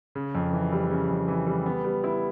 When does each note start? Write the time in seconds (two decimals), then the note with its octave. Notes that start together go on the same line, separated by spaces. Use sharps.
0.15 C#3
0.35 F2
0.53 E3
0.72 G3
0.91 C#3
1.09 F2
1.28 E3
1.46 G3
1.66 B3
1.84 G3
2.04 E4